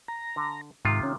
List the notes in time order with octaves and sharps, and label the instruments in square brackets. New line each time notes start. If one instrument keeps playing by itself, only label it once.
[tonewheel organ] A#5
[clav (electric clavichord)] D3
[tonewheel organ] G#2 [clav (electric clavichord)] C3 D#3 F4
[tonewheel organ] C#4